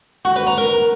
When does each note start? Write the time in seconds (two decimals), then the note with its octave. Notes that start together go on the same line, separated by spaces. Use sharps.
0.25 F#4
0.36 B4
0.47 A#5
0.58 A#4